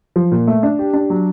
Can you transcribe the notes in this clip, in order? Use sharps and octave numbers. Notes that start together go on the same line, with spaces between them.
F3
A#2
A3
D4
G4
D4
F#3